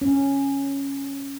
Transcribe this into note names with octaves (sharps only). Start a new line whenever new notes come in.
C#4